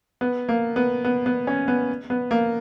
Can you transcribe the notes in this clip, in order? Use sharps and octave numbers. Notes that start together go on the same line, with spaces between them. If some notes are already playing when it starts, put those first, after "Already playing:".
B3
A#3
B3
B3
B3
C#4
B3
B3
A#3